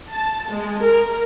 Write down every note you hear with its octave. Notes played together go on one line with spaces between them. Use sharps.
A5
G#3
A#4